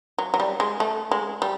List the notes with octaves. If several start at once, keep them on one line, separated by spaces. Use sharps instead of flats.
F#3
F#3
G3
G#3
A3
G#3
G3